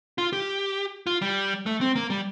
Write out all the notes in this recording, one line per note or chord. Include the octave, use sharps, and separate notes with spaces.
F4
G4
F4
G3
A3
C4
A#3
G3